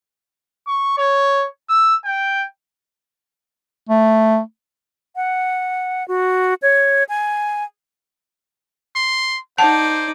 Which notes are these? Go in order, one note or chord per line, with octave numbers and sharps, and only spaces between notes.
C#6
C#5
E6
G5
A3
F#5
F#4
C#5
G#5
C6
D#4 C5 D5 F#5 A5